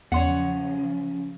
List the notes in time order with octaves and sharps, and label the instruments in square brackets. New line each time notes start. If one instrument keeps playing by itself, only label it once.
[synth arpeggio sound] E2 C6 [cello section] C#3 F3 F#3 [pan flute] C#4 [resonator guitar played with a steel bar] C#5 F#5